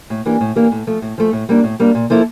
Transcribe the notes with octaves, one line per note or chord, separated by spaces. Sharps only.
A2
E3 A#3 D4 G4
A2
E3 A#3 D4 G4
A2
F3 A3
A2
F3 A3
A2
G3 A#3 D4
A2
G3 A#3 D4
A#2
F3 A#3 E4 A4